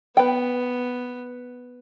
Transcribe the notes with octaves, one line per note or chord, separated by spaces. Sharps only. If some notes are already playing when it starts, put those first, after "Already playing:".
B3 B4 G5